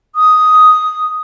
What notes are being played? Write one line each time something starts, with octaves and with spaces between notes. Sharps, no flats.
D#6